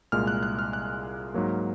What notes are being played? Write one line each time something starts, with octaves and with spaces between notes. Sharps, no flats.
C2 A#2 G#3 F6
F#6
F#6
F6
F#6
G#2 F#3 A#3